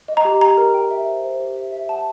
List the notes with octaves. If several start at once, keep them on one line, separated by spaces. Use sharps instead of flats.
D#5
A#5
G4
G5 A#5
A#4
G5
E5
C5
C5
G4
E5
E5
F#5 A5